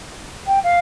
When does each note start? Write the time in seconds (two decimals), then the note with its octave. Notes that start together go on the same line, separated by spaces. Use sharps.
0.47 G5
0.63 F5